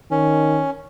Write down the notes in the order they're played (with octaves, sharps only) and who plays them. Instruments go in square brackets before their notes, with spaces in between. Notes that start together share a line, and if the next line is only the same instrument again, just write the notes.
[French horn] D#3 [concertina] C#4